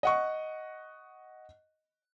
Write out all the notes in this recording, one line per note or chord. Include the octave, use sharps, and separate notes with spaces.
D#5 F#5 C#6